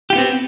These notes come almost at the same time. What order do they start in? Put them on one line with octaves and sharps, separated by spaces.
G4 F4 B3 C4